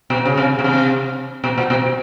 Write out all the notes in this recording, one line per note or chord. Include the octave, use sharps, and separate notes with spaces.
B2
C#3
C3
B2
C3
B2
A#2
B2